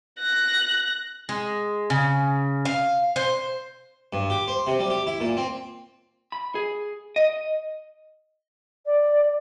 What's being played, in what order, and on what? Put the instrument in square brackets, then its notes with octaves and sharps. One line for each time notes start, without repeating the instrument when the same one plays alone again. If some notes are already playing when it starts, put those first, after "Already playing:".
[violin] F#6 A#6
[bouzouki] G#3
C#3
F5
C5
[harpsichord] G2
G4
C5
C3
G3
G4
E4
A#2
C4
[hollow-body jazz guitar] B5
G#4
D#5
[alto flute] D5